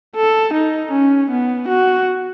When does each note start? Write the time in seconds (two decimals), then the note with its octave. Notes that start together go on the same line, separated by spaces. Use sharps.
0.16 A4
0.54 D#4
0.92 C#4
1.31 B3
1.69 F#4